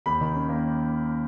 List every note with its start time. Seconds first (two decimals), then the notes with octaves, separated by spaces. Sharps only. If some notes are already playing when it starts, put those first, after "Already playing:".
0.06 D#2 B5
0.21 D#3
0.35 C#4
0.49 A#3